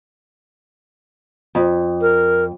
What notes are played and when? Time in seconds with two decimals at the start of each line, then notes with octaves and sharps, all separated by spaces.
1.55 F2
2.01 A#4